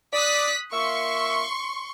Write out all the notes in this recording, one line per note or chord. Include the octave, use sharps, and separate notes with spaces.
D5 D#6 F#6 B6
A#3 F4 E5 C6 C#6